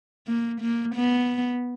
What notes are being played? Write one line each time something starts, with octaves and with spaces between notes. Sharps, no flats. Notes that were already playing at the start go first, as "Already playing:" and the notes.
A#3
A#3
B3